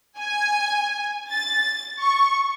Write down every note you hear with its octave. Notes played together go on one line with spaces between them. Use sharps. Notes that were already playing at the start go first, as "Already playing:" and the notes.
G#5
A6
C#6